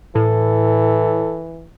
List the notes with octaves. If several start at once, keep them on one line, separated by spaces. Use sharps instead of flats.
A2 E3 A4